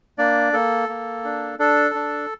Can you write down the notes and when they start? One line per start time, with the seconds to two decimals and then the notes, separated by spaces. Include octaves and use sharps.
0.18 A#3 D4 D5
0.53 A#3 A4
0.89 A#3
1.24 D4
1.59 D4 A4
1.95 D4